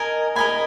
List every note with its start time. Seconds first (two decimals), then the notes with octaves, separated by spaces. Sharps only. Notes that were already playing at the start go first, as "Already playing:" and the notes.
Already playing: A#4 D#5 G#5 A#5
0.36 A#4 D#5 G#5 B5